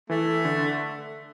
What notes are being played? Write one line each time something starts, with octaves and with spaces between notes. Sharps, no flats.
E3 A3
D3